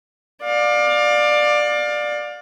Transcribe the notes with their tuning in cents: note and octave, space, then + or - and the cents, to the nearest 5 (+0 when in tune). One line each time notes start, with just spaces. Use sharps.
D5 +15 F5 +30